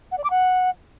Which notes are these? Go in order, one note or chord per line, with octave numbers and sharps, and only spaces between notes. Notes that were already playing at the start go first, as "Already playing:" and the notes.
F#5
D5
D6
F#5